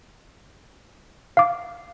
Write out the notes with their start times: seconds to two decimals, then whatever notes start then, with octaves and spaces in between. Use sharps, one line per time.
1.37 F5 D6